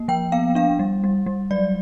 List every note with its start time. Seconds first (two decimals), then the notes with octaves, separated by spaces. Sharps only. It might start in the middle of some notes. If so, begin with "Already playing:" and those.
Already playing: A#3
0.08 F3 G5
0.32 B3 F5
0.55 D4 F5
0.79 G3
1.04 G3
1.26 G3
1.51 F#3 D5